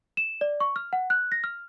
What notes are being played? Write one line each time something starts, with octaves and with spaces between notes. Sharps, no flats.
E7
D5
C#6
F6
F#5
F#6
A#6
F6